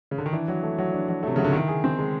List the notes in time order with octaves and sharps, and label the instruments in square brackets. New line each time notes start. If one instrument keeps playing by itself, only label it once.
[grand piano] C#3
D3
D#3
[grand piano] E3 [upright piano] D4
[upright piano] F#3
A3
F#3
D4
F#3
[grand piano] C3 [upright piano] A3
[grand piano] C#3 [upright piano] F#3
[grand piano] D3
[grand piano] D#3 [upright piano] E4
[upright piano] G#4
C4
G#3